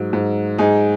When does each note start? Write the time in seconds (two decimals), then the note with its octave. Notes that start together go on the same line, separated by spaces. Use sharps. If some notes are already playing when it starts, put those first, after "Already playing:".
Already playing: G#2 F#3
0.13 G#2
0.58 G#2 D#4 G#4